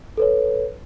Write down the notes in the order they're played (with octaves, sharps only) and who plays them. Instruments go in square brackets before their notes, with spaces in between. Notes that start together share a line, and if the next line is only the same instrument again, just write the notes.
[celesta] A4 B4 C#5